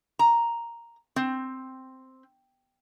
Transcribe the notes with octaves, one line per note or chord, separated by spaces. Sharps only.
A#5
C4